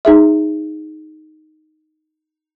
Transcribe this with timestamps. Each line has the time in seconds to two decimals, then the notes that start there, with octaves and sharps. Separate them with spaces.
0.05 D#4 G#4 E5